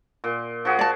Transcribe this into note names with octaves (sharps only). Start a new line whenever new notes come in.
A#2
F3 F#4 G#4
D5 A5